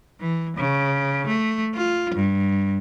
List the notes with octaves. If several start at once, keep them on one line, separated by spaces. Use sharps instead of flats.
E3
C#3
A3
F4
G2